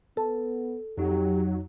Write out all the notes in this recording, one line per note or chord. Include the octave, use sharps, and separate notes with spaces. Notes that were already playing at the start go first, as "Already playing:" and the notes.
B3 A4
F2 F#3 D#4 G4